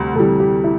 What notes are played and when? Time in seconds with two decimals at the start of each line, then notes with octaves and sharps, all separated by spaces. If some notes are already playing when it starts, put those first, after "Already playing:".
Already playing: D2 C3 G3
0.15 D2 C3 E3 G3 A4
0.40 G4
0.64 E4